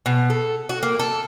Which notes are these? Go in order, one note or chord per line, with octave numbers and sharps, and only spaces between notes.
B2
A4
F#4
A#3
A4